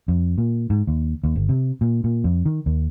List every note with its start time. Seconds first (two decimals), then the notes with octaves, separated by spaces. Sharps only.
0.08 F2
0.38 A#2
0.70 G#2
0.87 D#2
1.24 D#2
1.36 G1
1.49 C3
1.81 A#2
2.04 A#2
2.24 F2
2.46 D#3
2.66 D#2